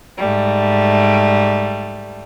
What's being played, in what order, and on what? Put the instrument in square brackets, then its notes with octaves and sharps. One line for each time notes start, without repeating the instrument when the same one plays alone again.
[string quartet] G#2 G3 A3